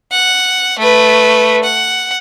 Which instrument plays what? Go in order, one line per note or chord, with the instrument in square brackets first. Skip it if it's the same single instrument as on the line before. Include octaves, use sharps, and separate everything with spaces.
[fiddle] F#5
A3 B4
F#5